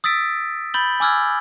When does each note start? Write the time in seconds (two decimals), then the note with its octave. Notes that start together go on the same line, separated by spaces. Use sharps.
0.04 D#6 E6 A6 B6 D7
0.74 B5 G6 A6 F#7 G7
1.00 G#5 D6 E6 F6 G#6